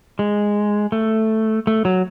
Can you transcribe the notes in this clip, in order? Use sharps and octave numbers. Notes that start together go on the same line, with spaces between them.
G#3
A3
A3
F#3